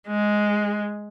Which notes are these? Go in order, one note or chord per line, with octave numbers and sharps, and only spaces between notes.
G#3